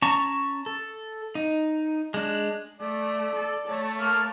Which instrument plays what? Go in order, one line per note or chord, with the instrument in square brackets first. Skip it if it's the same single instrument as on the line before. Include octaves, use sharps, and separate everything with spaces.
[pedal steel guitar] C#4 A5 A#5 C#6
A4
D#4
G#3 D4
[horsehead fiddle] A3 [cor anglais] D5
[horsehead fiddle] A4
[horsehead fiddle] A3 [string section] C#5 A5
[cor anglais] A#3